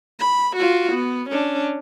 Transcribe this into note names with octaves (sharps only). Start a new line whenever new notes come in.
B5
F4 F#4
B3
C#4 D4